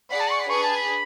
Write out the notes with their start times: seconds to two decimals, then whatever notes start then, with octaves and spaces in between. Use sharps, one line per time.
0.11 G#4 D5 F#5 B5
0.20 A5
0.31 C#6
0.40 B5
0.50 D4 G#4 B4 C#6
0.63 A5
0.76 B5